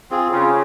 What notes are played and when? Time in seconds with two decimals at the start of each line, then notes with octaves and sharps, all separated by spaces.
0.11 C4 F4 G#4
0.32 C#3 F4